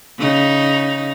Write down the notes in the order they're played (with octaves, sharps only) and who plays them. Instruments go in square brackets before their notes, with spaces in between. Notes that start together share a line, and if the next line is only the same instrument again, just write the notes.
[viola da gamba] C#3 D#4